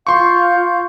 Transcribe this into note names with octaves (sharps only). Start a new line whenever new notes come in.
F4 F5 C6 C#6 G6